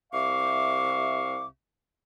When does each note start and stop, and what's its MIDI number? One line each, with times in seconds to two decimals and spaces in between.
0.13 1.46 36
0.13 1.46 48
0.13 1.46 76
0.13 1.46 77
0.13 1.46 85
0.13 1.46 86